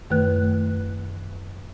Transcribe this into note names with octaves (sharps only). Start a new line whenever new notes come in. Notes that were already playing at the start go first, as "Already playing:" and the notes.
F#2 D#3 A3 B4 F#6